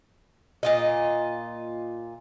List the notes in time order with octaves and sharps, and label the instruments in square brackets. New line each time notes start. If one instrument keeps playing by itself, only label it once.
[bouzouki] A#2 F4 D#5